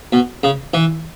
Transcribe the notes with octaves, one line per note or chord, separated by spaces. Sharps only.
B2
C#3
E3